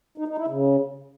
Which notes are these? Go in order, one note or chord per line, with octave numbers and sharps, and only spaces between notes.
D#4
D#4
E4
C#3